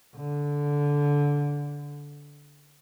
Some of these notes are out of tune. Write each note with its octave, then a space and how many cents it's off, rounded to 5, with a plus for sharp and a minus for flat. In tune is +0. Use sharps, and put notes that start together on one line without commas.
D3 -15